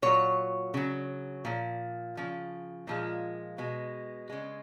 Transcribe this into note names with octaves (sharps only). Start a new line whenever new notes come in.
A#2 F#3 C#5
C#3 F#3
A#2 F3
C#3 F3
A#2 F3 G#3
B2 G#3
C#3 G#3